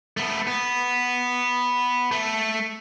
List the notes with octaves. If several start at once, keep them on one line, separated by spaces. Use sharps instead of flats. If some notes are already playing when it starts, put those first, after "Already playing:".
A3 B3
B3
A3